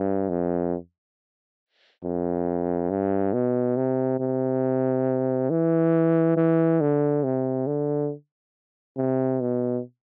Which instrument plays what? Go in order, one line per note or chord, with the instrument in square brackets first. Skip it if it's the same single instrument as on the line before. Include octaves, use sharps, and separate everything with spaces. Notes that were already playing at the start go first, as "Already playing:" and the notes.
Already playing: [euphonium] G2
F2
F2
G2
B2
C3
C3
E3
E3
D3
C3
D3
C3
B2